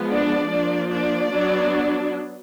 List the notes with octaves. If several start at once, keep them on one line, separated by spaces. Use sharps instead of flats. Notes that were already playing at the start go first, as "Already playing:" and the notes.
Already playing: F3 G#3 B3
D4 D5
F3 A#3 D4
D4 D5
F#3 B3 D4